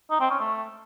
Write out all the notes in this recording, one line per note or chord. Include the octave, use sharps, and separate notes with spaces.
D#4
C4
C#4
A3